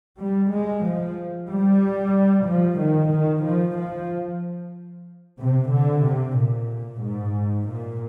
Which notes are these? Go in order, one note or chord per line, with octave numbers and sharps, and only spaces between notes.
G3
G#3
F3
G3
F3
D#3
D#3
F3
F3
C3
D3
C3
A#2
G#2
A#2